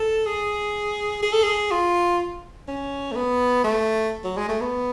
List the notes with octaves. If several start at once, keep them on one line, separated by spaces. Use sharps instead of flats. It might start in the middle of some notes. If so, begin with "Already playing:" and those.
Already playing: A4
G#4
G#4
A4
G#4
F4
C#4
A3
B3
A3
F#3
G#3
A3
B3